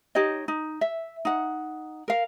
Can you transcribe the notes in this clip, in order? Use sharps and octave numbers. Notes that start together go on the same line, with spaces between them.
D#4 G4 C#5 D#5
D#4
E5
D#4 F#5
A#4 F5